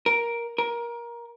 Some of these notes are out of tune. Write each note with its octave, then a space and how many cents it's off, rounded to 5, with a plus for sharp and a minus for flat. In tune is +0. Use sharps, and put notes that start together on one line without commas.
A#4 +10
A#4 +20